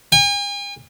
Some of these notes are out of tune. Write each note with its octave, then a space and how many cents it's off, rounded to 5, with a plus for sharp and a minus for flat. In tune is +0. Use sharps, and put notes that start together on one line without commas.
G#5 -45